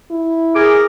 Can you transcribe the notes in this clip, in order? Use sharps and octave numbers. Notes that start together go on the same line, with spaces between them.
E4
G#4 A#4 D6